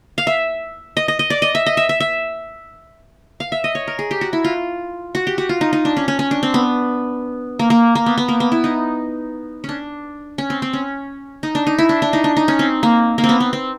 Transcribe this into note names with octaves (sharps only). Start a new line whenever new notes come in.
F5
E5
D#5
D#5
D#5
D5
D#5
E5
D#5
E5
E5
E5
F5
E5
D#5
C#5
A#4
G#4
G4
F#4
E4
F4
F#4
G4
F#4
F4
D#4
D#4
D4
C#4
C#4
C#4
D4
C4
B3
A#3
A#3
A#3
B3
B3
A#3
B3
E4
D#4
C#4 D4
C#4
C4
C4
C#4
D#4
D4
D#4
E4
D4
D4
D#4
D4
D#4
C#4
C4
A#3
A#3
C4
B3
C4
C4